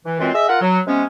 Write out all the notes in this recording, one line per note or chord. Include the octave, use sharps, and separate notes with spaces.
E3
F#2 E3 G#3 C4 F4
G#4 D#5 E5
F4 A#4 F#5
F#3
C3 G#3 B3 C#4